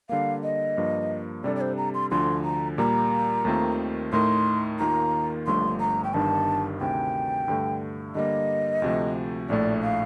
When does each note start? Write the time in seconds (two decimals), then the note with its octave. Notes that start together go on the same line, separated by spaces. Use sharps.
0.09 D3 G3 A#3 F5
0.43 D#5
0.77 G2 F3 A#3
1.44 C3 G3 D4 A4 D5
1.56 D5
1.61 C5
1.77 A#5
1.94 C6
2.11 D2 D3 F3 C6
2.45 A#5
2.78 A#2 G3 A#3 A#5
3.45 D#2 D#3 A3 C4 F4
4.12 A2 A3 D#4 A#4 C6
4.79 D#2 D#3 A#3 F4 A#5
5.46 G1 G2 F3 A3 C6
5.80 A#5
6.04 G5
6.14 G1 G2 D#3 G3 D4 A5
6.81 D2 C3 D#3 G5
7.48 G2 D3 A3
8.15 D3 G3 A#3 D#5
8.82 D2 C3 F3 A3
9.49 A#1 A2 A3 D5
9.83 F5